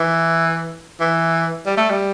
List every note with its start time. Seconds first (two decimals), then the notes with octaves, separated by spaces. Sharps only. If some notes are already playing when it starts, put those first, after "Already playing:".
Already playing: E3
1.00 E3
1.66 G3
1.77 A3
1.90 G3